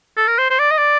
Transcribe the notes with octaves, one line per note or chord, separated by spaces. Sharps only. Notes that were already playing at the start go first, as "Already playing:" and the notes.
A4
A#4
C5
C5
D5
D#5
D5